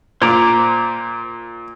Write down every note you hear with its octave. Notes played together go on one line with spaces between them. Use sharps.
A#2 C5 A#5 D6